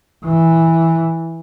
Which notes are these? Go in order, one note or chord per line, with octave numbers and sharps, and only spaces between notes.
E3